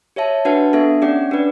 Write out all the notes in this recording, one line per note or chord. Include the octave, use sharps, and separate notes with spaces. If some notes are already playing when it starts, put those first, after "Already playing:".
G4 C#5 E5 A5
D4 F#4 B4 F#5 A5
B3 D4 A4 E5
C#4 G4 D5 F#5
D4 G4 B4 D5